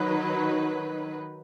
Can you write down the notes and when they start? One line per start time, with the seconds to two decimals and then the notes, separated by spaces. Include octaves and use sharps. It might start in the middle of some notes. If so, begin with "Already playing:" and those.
Already playing: D#3 F#3 D#4 B4